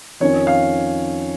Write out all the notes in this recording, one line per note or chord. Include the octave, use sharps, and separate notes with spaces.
F2 D#3 C#4 C#5
F5